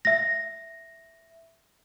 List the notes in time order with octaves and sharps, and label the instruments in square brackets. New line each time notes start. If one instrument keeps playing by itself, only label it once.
[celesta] E5 A#6